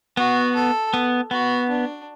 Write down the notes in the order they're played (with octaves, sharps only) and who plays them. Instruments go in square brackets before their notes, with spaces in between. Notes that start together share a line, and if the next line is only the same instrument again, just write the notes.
[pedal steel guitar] B3 [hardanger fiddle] F#4
[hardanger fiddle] A4
[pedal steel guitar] B3
[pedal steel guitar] B3 [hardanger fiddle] F#4
[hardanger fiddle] D4